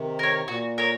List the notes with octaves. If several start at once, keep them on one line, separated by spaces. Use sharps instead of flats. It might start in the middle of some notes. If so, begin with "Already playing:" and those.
Already playing: C3 D#3
A#4 C#5
A#2 F#4
A#4 C#5